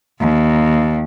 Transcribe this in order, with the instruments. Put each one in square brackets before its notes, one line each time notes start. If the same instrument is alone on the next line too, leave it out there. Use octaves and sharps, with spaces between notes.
[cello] D#2